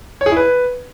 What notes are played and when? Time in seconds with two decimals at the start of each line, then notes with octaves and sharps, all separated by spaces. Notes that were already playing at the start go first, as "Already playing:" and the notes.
0.21 C#5
0.26 G#4
0.31 E4
0.36 B4